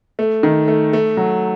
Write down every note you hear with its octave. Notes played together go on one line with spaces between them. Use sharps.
A3
D#3
A3
A3
F#3